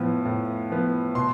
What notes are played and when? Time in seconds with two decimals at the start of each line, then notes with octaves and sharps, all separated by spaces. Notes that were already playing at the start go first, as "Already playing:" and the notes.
Already playing: A2 F3 B3
0.25 A2
0.70 F3 B3
1.15 B2 C6